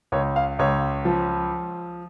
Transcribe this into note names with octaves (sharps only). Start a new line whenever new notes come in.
C#2 C#5
F5
C#2 C#5
F3